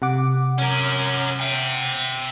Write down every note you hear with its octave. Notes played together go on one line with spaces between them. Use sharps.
C3 F#5 D6
C#4 A#4
E5 G5